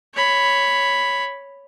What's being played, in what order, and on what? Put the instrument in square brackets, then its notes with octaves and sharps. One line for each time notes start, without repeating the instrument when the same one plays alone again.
[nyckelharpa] C#5 B5